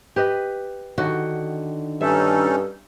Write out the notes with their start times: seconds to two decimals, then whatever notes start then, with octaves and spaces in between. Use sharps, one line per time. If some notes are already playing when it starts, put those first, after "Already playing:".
0.16 G4 B4 D#5
0.98 D3 D#3 F#4
2.01 G2 C#4 D#4 A4 E5